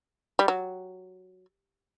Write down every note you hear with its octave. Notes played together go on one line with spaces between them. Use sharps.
G3
F#3